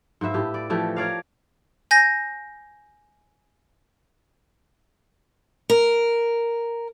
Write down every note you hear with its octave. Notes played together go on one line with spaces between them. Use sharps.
G#2 A#3 B4 E5
A2 G4
D5
E3 F3 A3 G4
A#4 C#5 D5 F5
G#5 G6 A#6
A#4